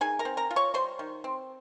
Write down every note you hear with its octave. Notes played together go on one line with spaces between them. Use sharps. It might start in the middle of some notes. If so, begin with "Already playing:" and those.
D#3 G#4 G#5
A#4 A#5
C4
A#4 A#5
F4
C#5 C#6
G3 C5 C6
D#3
C4